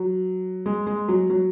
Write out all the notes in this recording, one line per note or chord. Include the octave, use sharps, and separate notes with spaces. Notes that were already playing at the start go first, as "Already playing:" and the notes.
Already playing: F#3
G#3
G#3
F#3
F#3